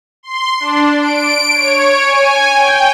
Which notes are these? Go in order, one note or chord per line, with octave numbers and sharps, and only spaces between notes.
C6
D4
D7
C#5
G#5
G5